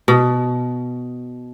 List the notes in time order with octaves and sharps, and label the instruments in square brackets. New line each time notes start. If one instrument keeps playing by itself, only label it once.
[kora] B2